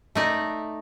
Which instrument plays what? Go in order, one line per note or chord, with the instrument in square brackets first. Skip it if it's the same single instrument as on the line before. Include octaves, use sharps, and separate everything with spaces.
[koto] A3 D#4 D5